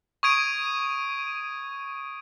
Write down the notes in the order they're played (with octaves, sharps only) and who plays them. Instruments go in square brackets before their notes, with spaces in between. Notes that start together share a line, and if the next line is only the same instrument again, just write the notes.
[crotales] C#6 D#6 G#6 D7 D#7